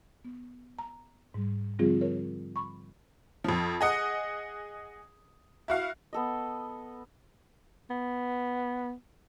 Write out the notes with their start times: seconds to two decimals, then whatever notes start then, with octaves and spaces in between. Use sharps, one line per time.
0.25 B3
0.79 A#5
1.34 G#2 G3
1.79 D3 F3 G3 C4 F4 G#4
2.01 A#4 C#5
2.56 B5 C#6
3.44 F2 F3
3.81 G#4 D#5 F#5
5.68 E4 F#4 F5
6.13 B3 A4 D#5
7.90 B3